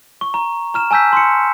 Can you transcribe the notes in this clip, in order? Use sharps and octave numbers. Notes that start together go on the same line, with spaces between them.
C#6
A#5
A#5 F6 E7
G#5 A5 E6 G6 B6
C6 C#7